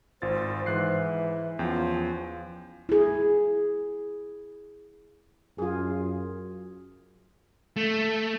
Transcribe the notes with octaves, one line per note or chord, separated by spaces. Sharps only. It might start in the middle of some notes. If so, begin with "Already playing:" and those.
G#1 F4 C5 A6
G#2 E3 F#6 C7
E2 F3 C#4 G5
E4 G#4
F#2 F4 G#4
A3